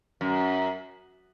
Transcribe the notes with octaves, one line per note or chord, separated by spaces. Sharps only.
F#2